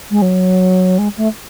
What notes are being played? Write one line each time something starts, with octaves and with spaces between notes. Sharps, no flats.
G#3
F#3
G#3
A3